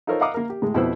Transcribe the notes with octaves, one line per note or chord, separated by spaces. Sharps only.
D#4 F4 A4 A#4 C5 C#5
D#5 F5 F#5 A#5 D6 D#6
A#3 A#4
G4
A2 G#3
F2 B2 E4 B4 C5 E6